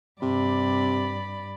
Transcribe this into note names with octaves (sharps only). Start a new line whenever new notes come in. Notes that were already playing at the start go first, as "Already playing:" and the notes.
G2 C3 D5 B5